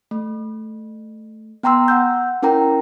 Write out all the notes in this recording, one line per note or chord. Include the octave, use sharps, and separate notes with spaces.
A3
B3 G5 A#5 C6 E6
F#5 E6 G6
C#4 E4 A#4 G5 A#5